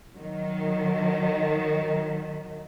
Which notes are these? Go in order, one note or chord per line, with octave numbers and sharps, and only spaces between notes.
D#3 F#3